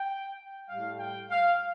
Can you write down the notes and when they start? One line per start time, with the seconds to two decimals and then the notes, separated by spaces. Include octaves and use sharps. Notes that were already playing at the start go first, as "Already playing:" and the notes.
Already playing: G5
0.69 A2 G3 F5
0.99 G5
1.30 F5